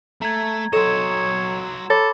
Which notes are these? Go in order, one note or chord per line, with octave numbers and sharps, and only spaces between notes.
A3 A#5 G#6
F#3 A4 C#5 D#5 C6 E6 E7
A4 C#5 B5 D6 A#6